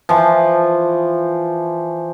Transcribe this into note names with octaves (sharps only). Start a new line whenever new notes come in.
E3 F3